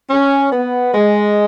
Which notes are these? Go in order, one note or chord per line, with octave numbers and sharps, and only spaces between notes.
C#4
B3
G#3